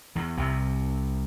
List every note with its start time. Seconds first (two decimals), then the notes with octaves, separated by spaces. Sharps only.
0.15 E2 E3
0.37 C2 C3